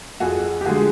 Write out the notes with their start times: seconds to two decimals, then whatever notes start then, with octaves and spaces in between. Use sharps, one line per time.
0.20 F2 F#4 G#4
0.61 G4
0.65 D3 F3 G#3 F#4 G#4